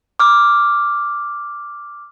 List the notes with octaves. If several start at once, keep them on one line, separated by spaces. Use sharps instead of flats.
D6 F6